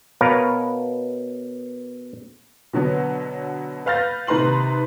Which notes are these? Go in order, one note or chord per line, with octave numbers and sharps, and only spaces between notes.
B2 A#4 B4 C#5 F5
B2 D3 F#3 B3
B4 F5 F6 G6 A6 A#6
C3 D#3 B4 A#5 C6 F#7